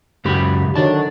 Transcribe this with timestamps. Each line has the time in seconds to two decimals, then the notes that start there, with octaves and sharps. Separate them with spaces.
0.25 C#2 F#2 G4 B5
0.76 D3 D#3 F#3 C#5 D5 A5